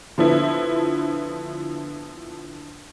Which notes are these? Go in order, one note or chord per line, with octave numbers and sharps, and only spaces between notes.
D3 F3 B3 E4